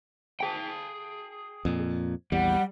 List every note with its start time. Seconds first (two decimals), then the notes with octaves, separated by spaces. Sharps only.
0.40 G#4 G5
1.65 F2 A#2
2.32 A#1 E2 G3 F#5